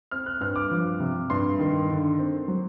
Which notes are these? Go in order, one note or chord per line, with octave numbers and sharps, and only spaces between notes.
C4 F6
F#6
G2 F6
D6
F3
C3
G2 C6
D#3
D3
C4
F#3